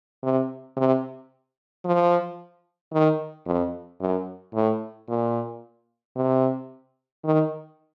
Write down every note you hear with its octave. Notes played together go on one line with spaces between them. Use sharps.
C3
C3
F3
D#3
F2
F#2
A2
A#2
C3
D#3